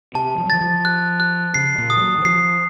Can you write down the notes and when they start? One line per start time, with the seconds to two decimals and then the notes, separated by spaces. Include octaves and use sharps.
0.15 C3 A5
0.38 F3
0.45 F#3
0.50 F3 A6
0.61 F3
0.85 F#6
1.20 F#6
1.54 C#3 C7
1.78 A#2
1.90 D#6
1.96 F3
2.01 F#3
2.18 D#3
2.25 F3 C7